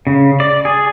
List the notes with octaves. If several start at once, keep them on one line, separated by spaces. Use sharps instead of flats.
C#3
D5
G#4